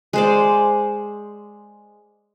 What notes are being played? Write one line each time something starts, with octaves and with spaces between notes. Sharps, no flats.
G#3 C5 D5